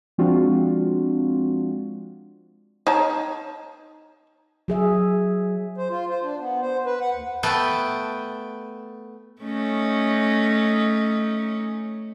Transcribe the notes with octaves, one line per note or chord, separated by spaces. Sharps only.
F3 G#3 C4 D4 F4 F#4
D#4 C#5 A5
F#3 G#4 E5
C5
F4
C5
D4
B3
C5
B4
F#5
D#2
A3 B3 B4 G5 A5
A3 C#4 D#4